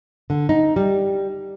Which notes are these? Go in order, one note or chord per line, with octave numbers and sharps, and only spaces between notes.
D3
D#4
G3